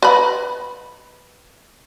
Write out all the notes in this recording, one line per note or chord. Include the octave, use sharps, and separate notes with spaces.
B4 D#5 B5